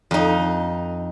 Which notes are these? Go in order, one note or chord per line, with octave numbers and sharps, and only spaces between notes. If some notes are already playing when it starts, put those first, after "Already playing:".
F2 D#4